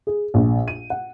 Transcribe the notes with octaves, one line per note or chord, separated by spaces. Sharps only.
G#4
A#1
D#7
F#5